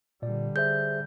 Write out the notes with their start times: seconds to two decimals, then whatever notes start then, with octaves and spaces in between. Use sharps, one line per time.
0.22 A#2 D3 G3 D5
0.56 G#4 C5 E5 G6